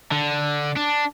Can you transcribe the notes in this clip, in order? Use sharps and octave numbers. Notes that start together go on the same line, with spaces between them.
D3
D4